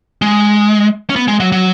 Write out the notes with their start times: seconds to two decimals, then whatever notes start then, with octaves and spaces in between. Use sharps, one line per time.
0.22 G#3
1.10 C#4
1.16 B3
1.28 G#3
1.40 F#3
1.52 F#3